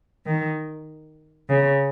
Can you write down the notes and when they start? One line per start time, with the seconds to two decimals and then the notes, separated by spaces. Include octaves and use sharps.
0.25 D#3
1.49 C#3